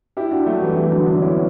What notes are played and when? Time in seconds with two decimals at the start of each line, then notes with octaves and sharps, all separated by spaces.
0.17 E4 G4
0.31 D4 F#4
0.46 F#3 A3
0.61 E3 G3
0.76 E3 G3
0.92 D3 F#3
1.06 B3 D4
1.22 C#4 E4